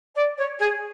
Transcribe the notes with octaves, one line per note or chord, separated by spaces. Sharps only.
D5
C#5
G#4